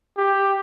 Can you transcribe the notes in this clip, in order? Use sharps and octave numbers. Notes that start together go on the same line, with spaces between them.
G4